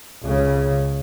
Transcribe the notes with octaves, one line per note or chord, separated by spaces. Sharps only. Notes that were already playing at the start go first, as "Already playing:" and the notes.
C#2 C#3